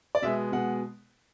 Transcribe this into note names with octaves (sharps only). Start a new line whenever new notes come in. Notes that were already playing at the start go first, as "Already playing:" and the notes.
D5
B2 G#3 B3 E5
B2 G#3 B3 F#5